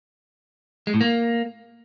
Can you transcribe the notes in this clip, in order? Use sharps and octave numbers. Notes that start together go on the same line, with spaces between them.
G#3
A2
A#3